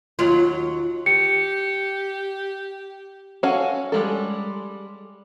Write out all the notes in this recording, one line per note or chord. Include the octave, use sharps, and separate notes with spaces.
D#2 F#3 F4
G4 C#7
C#4 F#4 A4 F5 G#5
G3 G#3 A4